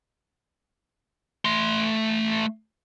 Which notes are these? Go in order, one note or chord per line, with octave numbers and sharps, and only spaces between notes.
A3 C6